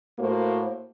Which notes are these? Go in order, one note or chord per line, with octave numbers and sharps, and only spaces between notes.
A2 A#3 F#4 C5